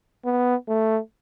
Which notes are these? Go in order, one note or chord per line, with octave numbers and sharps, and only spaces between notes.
B3
A3